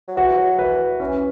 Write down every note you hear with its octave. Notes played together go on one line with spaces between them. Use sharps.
F#3
E3 F#4
F#3
E3 B4
E3 C#4